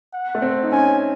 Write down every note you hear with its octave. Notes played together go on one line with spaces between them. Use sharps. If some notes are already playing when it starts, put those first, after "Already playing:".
F#5
A3
C4
D#4
C#4 G#5